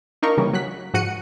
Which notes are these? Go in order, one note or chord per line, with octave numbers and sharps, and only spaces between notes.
D4 D#4 F4 A#4 C#6
C#3 E3 G3 A#3 C#4
F#3 F#6 B6
G#2 F3 F#4 F#6 C#7 D#7